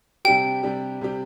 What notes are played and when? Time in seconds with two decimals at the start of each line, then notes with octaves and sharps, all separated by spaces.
0.25 C3 G3 D4 G4 G5
0.63 C3 G3 D4 G4
1.01 C3 G3 D4 G4